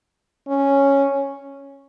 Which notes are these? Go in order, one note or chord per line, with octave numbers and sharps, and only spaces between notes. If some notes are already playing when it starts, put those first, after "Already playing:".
C#4